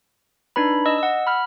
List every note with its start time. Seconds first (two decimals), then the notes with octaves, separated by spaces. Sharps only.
0.56 D4 D#4 B4 B5
0.86 D#5 E6
0.98 F#5 E6
1.27 B5 F6